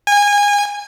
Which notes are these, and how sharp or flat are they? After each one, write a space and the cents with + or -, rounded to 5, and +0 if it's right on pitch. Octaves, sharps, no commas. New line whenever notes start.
G#5 -25